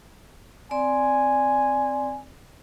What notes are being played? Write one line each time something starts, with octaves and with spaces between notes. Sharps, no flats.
C4 D5 G#5 C6